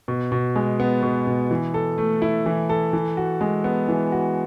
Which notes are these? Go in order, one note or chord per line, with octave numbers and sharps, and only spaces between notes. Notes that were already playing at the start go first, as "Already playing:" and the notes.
B2
B2
G#3
B3
B2
B2
E3
A4
A3
E4
E3
A4
E3
F#4
G#3
B3
E3
F#4